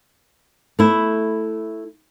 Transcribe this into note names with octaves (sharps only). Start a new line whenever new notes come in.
A3 E4